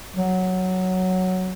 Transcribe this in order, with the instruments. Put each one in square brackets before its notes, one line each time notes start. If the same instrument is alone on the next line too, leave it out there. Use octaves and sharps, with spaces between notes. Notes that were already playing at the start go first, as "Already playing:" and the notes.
[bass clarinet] F#3